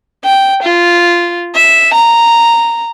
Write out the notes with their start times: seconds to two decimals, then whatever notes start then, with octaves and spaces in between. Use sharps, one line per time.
0.25 G5
0.63 F4
1.55 E5
1.94 A#5